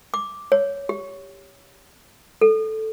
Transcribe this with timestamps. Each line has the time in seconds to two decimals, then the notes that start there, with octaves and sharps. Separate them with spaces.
0.14 D6
0.52 C#5
0.89 G4
2.41 A4